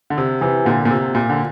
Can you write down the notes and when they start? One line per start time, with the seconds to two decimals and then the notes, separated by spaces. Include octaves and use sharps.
0.10 D3
0.18 C3
0.41 C3 E3
0.65 A#2 D3
0.85 A#2
0.91 C3
1.15 A#2
1.30 D3